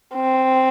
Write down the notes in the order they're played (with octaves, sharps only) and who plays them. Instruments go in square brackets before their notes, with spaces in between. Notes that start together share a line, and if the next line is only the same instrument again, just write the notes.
[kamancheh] C4